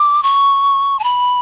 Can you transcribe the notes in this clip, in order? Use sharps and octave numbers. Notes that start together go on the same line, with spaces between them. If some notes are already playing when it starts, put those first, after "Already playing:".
Already playing: D6
C#6
A5
B5